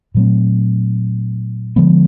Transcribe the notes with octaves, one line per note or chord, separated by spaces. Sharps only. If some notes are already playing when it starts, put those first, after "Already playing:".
A#2 F#3 A3 C4
D3 F3 G#3 B3